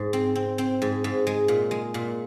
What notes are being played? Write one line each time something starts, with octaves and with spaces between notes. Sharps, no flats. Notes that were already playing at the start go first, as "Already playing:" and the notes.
Already playing: G#2
C4
C4
C4
G#2
G#2
G#3
A#2
G#3
A#2